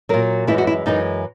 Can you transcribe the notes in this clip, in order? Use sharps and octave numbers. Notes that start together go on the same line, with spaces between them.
A#2 F#3 A#4
F#2 E3 G#3 E4
F#4
E4
F#2 E3 G#3 D#4